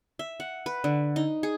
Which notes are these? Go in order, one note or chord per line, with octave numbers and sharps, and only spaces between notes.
E5
F#5
B4
D3
D#4
G#4